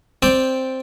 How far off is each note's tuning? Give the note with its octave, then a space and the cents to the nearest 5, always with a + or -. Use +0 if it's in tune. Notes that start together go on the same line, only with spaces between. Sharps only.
C4 +0 D5 +0 G5 +0